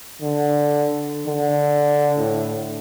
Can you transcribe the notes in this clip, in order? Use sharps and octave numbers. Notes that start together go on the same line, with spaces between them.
D3
D3
A2